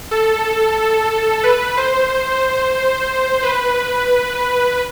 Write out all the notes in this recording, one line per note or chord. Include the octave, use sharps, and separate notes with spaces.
A4
B4
C5
B4